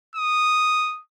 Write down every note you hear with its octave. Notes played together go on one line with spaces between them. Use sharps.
D#6